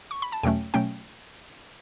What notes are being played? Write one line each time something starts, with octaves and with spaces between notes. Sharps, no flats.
C#6
B5
A5
E2 B2 F#3 A3 C#4 G5
B2 F#3 A3 C#4 G5